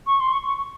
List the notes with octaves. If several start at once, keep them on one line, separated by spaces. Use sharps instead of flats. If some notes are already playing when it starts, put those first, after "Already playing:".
C#6
C6
C#6
C#6